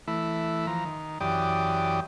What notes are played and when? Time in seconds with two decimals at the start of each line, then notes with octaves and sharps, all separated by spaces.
0.08 E3 A3 E4
0.67 E3 F3 A#5
0.85 D#3
1.21 F#2 E3 G4 D5 G5 D#6